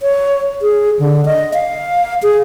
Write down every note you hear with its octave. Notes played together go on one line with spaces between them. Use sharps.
C#5
G#4
D3
D#5
F5
G#4